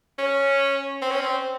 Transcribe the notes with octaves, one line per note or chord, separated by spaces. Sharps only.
C#4
C4
C#4
C4